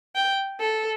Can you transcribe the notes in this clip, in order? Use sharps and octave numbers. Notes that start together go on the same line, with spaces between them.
G5
A4